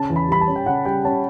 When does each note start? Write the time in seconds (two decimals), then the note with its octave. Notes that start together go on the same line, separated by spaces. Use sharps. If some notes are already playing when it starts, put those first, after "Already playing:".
Already playing: C#3 A5
0.10 E2
0.16 B5
0.28 G3 B5
0.41 A5
0.47 C#4
0.56 G5
0.66 C#3 F#5
0.85 G3 G5
1.05 C#4 A5